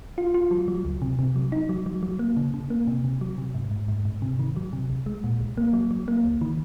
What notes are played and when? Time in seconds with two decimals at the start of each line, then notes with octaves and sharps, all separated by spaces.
0.18 F4
0.34 F4
0.51 F#3
0.68 F#3
0.85 C#2
1.02 C3
1.19 C3
1.36 F#3
1.52 D#4
1.69 F#3
1.86 F#3
2.03 F#3
2.19 A#3
2.37 C#3
2.54 C#3
2.70 A#3
2.87 C3
3.04 C3
3.21 F#3
3.38 C3
3.55 G#2
3.71 G#2
3.88 G#2
4.05 G#2
4.22 C3
4.39 D#3
4.56 F#3
4.73 C3
4.90 C2
5.06 G#3
5.24 A#2
5.41 C2
5.58 A#3
5.73 F#3
5.91 F#3
6.08 A#3
6.24 C#2
6.41 D#3